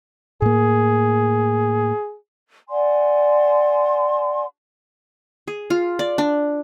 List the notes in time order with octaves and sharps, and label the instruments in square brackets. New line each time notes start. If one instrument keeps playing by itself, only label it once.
[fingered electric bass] A2 A#3 [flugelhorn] G#4
[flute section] D5 F#5 G#5 C6
[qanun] G#4
F4
D5
D4